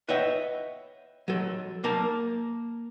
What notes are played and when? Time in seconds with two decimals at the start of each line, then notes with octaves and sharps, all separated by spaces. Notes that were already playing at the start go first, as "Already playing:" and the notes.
0.09 B4 C#5 D#5 E5 F#5 G5
1.28 F#3 A4
1.84 A#3 A#4 A5